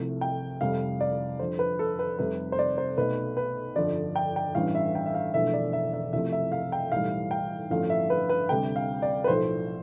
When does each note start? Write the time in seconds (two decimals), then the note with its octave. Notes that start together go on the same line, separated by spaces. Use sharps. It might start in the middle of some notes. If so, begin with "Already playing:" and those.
Already playing: C2 C3 F3 A3
0.21 G5
0.61 F1 F2 C3 G3 F5
1.01 D5
1.39 F2 D3 F3 C5
1.59 B4
1.79 A4
1.99 B4
2.19 F1 F2 C3 G3 B4
2.52 C5
2.59 D5
2.78 C5
2.97 B1 B2 A3 B4
3.37 B4
3.76 G1 F2 D3 F3 D5
4.16 G5
4.36 G5
4.55 A1 G2 E3 G3 F5
4.75 E5
4.95 G5
5.06 E5
5.15 F5
5.34 E1 E2 D3 F3 A3 E5
5.53 D5
5.73 E5
5.93 E5
6.13 C2 C3 F3 A3 E5
6.32 E5
6.52 F5
6.72 G5
6.92 B1 A2 E3 G3 F5
7.31 G5
7.70 A1 G2 D3 F3 A3 F5
7.90 E5
8.10 B4
8.29 B4
8.49 D2 C3 G3 G5
8.76 F5
9.02 D5
9.24 B4
9.28 B1 A2 F3 A3 C5